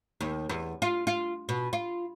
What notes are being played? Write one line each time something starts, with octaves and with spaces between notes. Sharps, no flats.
D#2
E2
F4
F4
B2
F4